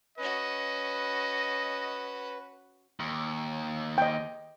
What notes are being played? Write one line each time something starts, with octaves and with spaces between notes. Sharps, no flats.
C#4 F#4 B4 D#5
D#2
D#5 G5